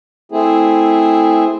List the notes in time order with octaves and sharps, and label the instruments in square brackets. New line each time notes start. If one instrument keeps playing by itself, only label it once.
[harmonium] A3 C4 E4 G#4